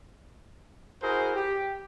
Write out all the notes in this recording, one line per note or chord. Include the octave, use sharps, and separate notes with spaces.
E4 F#4 G#4 A#4 C5
G4